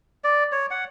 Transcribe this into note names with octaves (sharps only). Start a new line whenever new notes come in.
D5
C#5
F#5